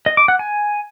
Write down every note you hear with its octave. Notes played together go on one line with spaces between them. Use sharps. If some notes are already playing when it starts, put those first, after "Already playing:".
D#5
D6
F#5
G#5